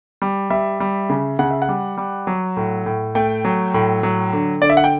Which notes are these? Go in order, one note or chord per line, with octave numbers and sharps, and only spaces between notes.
G3
G3 E5
G3
C#3
C#3 F#5
E5
F#5
G3
G3
F#3
A2
A2
A3 G5
F#3
A2
F#3
D3
D3 D5
E5
F#5
G5